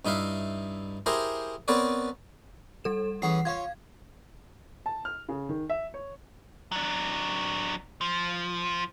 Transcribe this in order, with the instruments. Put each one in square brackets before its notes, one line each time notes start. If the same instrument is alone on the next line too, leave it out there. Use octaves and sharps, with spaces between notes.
[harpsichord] G2 D#4 E4 E5 F5
E4 G4 G#4 A#4 C5 A#5
B3 C4 A#4 B4 C#5 D5
[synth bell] G3 A4 E7
[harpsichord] E3 C#4 G#4 [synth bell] F#5 C7
[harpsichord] F4 C#5 [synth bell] F5 G#6
[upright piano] A5
F6
C#3
D#3
E5
C#5
[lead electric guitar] F#3 D4
F3